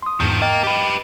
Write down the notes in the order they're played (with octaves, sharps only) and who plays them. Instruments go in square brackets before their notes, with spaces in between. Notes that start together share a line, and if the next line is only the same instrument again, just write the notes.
[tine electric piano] C6 D#6
[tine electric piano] E2 G#2 [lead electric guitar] D#3 F3
[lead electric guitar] A#3 [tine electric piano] D#5 G5 A6
[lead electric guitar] G4 B4